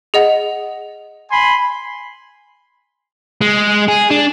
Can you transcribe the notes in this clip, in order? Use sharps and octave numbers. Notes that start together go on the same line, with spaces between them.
G#4 D#5 F#5
G#5 B5 C6
G#3
G#4
D4